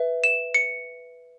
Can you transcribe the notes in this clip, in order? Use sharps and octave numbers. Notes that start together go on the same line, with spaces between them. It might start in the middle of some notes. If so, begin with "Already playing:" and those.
Already playing: B4 E5
E7
C#7